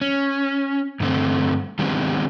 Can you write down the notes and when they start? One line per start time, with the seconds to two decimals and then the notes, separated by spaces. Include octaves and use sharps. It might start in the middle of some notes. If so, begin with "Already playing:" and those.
0.01 C#4
1.00 G2 D3 A3 C4
1.79 D#3 G3 G#3 B3 C4 D4